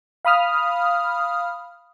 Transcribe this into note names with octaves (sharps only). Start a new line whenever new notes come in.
F5 B5 D#6 F6